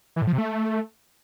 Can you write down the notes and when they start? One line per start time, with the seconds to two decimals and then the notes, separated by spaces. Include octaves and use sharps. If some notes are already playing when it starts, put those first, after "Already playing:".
0.16 E3
0.22 A2
0.27 F3
0.33 C3
0.38 A3